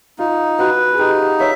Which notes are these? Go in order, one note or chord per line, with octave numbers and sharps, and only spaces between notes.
D#4 F4
F#4 B4
G#4
D#4 G4
C#5 E5